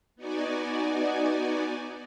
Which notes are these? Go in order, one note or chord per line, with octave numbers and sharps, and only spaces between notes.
B3 D#4 F#4 D5 G#5